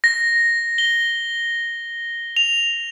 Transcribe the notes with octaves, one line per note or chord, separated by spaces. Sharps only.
A#6
G7
F7